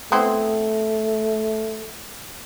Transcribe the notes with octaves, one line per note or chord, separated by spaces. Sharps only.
A3 B3 C4 E4